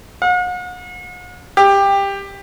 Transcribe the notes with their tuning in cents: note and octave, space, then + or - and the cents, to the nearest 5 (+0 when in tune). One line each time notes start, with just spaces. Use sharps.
F#5 -45
G4 +15